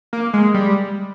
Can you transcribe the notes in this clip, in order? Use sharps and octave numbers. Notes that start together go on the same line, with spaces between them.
A#3
G#3
G3